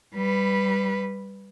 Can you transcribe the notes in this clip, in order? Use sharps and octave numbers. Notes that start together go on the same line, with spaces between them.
G3 B4